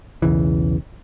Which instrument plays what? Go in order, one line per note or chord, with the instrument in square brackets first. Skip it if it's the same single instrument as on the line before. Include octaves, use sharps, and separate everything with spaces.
[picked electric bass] B1 E2 C#3 E3